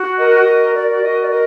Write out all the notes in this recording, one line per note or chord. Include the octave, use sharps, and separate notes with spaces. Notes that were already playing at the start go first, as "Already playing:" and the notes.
Already playing: F#4
A#4 D#5
F#4
A#4 D5
D5
F#4 D#5
D5
A#4 D#5